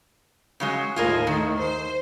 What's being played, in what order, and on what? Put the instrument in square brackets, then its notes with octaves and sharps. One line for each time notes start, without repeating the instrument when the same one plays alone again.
[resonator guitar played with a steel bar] C#3 F#3 G#3
[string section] D#2 A2 [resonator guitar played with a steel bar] F4 G#4 A#4
[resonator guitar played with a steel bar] D#3
[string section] C5